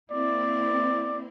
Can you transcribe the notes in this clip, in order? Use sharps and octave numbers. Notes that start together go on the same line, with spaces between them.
A#3 C4 E4 D5